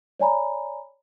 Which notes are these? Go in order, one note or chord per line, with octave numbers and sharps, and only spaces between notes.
C#5 D5 G#5 A#5 B5